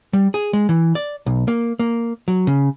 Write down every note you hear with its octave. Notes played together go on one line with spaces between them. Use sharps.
G3
G#4
G#3
E3
D5
B1
A#3
A#3
F#3
C#3